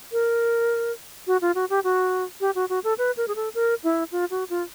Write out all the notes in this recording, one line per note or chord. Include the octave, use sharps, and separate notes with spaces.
A#4
F#4
F4
F#4
G4
F#4
G4
F#4
F#4
A4
B4
A#4
G#4
A4
A#4
E4
F4
F#4
F4